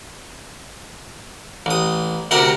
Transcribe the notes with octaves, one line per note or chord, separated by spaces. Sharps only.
A1 D#6
D2 C3 G4 A#4 F#5